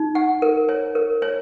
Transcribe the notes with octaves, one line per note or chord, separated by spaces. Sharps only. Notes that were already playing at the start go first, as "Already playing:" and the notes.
Already playing: D#4
F#5
A#4
C#5
A#4
C#5